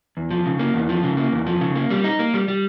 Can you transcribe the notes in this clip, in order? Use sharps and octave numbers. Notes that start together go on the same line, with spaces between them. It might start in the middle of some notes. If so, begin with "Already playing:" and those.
E2
F3
C#3
A#3
E2
F3
C#3
A#3
E2
F3
C#3
A#3
G3
D#4
A#3
G3
G3